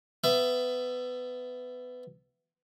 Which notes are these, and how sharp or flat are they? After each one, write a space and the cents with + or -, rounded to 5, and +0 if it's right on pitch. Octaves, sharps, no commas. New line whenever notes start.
B3 +20 E5 +25